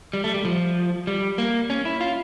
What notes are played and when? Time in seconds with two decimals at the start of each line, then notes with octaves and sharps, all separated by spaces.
0.13 G3
0.24 A3
0.34 G3
0.45 F3
1.07 G3
1.38 A#3
1.70 C#4
1.85 E4
2.01 F4